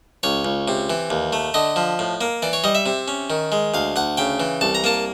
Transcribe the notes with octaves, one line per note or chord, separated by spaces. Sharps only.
C#2 C#5
C#2
C3
E3
D#2
A3
D3 D#5
F3
A2
A#3
E3 D5
C#5
G3 D#5
E5
C3
C#4
D#3
G#3
D2 F5
D2 F#5
C#3 G5
E3
C2 A5
A#5
A#3 A5